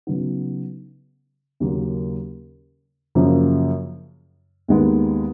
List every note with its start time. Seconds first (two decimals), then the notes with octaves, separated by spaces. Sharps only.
0.07 C#3 F#3 B3 D#4
1.60 D#2 C#3 F#3 A#3 C#4
3.15 F#2 C#3 F3 A#3
4.68 D#2 D#3 G#3 B3 D#4